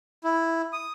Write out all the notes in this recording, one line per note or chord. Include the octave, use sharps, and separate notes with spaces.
E4
D#6